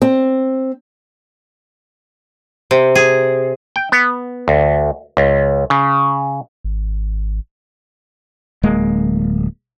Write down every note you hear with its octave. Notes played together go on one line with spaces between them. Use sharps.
C4
C3
G#4
G5
B3
D2
C#2
C#3
G#1
D1 G#3 A#3